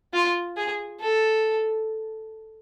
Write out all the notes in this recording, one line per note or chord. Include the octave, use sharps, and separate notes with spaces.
F4
G#4
A4